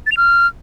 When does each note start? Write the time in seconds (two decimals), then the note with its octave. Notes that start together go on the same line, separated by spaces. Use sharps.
0.06 A6
0.12 F7
0.17 F6